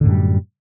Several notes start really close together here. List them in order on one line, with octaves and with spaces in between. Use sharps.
D3 A2 F#2 G3